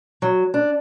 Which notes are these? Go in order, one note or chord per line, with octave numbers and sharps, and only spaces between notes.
F#3
D4